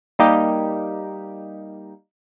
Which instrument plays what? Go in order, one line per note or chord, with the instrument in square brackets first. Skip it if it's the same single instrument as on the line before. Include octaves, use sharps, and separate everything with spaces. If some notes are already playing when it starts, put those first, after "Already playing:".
[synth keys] G3 A#3 D#4 G4